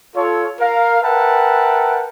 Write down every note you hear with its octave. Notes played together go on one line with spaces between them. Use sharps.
F4 A4 C#5
A#4 F5
A#4 B4 E5 F#5 G5 A5